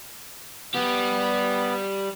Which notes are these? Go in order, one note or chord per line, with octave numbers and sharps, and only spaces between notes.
G3 B3 G4